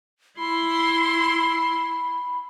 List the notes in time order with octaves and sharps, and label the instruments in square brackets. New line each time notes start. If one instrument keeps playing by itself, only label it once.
[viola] E4 C6 [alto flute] B5